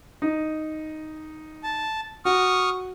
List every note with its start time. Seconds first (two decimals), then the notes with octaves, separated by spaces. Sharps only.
0.22 D#4
1.63 A5
2.25 F#4 C#6 D#6 F6